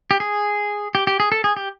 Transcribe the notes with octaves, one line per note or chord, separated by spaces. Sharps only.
G4
G#4
G4
G4
G#4
A4
G#4
G4